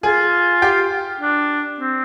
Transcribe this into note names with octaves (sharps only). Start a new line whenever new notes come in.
F4 G#4 G#5
G4 G5
D4
C4